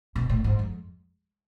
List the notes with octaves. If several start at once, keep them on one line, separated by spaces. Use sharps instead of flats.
B2
A2
G#2
F2